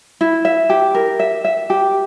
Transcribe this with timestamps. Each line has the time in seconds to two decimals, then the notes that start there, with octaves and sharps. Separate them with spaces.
0.21 E4
0.45 E5
0.70 G4
0.95 A#4
1.20 E5
1.45 E5
1.70 G4